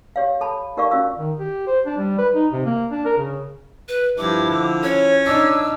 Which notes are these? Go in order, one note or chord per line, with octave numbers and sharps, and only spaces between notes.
G4 C#5 F5
A4 A5 B5
D#4 G4 A#4 D5 F5 C#6
C#4 F4 F#4 F5 E6
D#3
G4
C5
D4
G3
B4
D#4
C3
A#3
D4
A#4
C#3
B4
G2 F3 E4 D6
D3
C#4 C#5
D4 D#4 E6